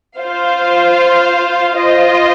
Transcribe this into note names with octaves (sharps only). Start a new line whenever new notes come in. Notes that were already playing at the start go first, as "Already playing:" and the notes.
F4 C5 F5
F4 C5 D#5